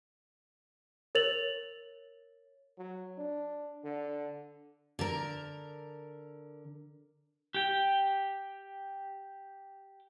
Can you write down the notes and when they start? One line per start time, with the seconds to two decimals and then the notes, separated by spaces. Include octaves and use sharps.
1.15 A#4 C#5 A6 F7 F#7
2.78 F#3
3.18 D4
3.84 D3
4.99 D3 A#4
7.54 G4 G5